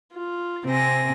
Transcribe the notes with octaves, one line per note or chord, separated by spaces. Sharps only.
F4
C3 C4 G#5 A#6